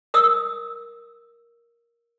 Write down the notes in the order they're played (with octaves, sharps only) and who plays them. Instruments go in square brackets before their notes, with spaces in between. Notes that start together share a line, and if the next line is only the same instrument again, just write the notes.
[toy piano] A#4 D#6 E6